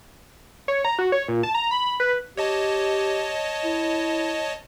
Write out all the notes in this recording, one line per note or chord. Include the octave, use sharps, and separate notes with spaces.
C#5
A#5
F#4
C#5
A#2
A5
A#5
B5
B4
G4 C#5 D#5 A5
E4